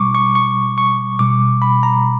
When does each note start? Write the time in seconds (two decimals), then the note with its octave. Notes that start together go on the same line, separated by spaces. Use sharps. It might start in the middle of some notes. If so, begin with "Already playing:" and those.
Already playing: B2 G3 C#6 D6
0.15 C#6
0.35 C#6
0.78 C#6
1.19 B2 G3 D6
1.62 B5
1.83 A#5